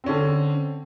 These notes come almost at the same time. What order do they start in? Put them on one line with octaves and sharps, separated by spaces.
C4 C#4 D3